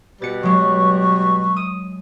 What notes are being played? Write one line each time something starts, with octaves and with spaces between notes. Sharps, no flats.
B2 G3 B4 A6 C#7
F#3 G#3 C#6
D#6